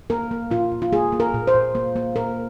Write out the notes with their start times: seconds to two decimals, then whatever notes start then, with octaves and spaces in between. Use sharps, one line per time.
0.10 A#3 A#4
0.31 A#3
0.51 A#2 F4
0.72 A#2
0.82 F4
0.93 A#3 G#4
1.12 A#3
1.20 A#4
1.34 A#2
1.47 C5
1.55 A#2
1.75 A#3
1.96 A#3
2.16 A#2 A#4